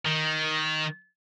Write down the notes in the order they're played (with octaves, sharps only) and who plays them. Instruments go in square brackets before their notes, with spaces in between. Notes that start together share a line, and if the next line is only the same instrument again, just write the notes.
[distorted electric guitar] D#3